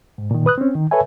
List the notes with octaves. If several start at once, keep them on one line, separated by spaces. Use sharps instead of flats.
G#2
A#2 D#3
B4 D#6 F#6
C4 C#4
D#3
A4 B4 C#5 E5 G#5